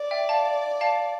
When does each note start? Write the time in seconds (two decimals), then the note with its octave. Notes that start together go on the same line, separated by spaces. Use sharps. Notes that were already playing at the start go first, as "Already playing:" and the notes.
Already playing: D5
0.11 E5 G5
0.29 F5 A5
0.81 F5 A5